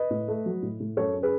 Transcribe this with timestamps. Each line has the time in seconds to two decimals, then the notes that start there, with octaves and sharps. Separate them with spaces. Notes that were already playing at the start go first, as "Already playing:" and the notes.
Already playing: B4 D#5
0.11 A2
0.28 A3
0.46 F#3
0.63 A2
0.80 A2
0.97 F#2 A4 C#5
1.14 C#4
1.23 G#4 B4